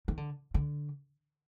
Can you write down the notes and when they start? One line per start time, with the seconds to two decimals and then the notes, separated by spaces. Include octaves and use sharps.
0.08 D#3
0.17 D3
0.54 D3